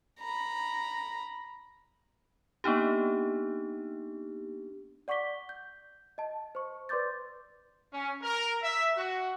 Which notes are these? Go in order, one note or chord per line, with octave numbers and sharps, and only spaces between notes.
A#5 B5
A#3 B3 D4 D#4 G4
D5 F#5 C#6 D6 B6 G7
G6
D#5 A5
C5 C#6
B4 D5 C6 D6 G6 A6
C#4
A#4
E5
F#4